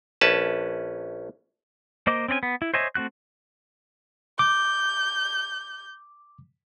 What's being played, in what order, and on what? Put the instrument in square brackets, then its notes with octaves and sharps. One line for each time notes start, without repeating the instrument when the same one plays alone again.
[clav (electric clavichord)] A#1 C#4 B4 A5
[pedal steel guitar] A#3 C5 D#5 D6
C4 C#4 D5 G#5
B3
E4
C5 C#5 D#5 E5 G#5
A3 C4 F#4 F#6
[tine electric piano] D6 [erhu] G6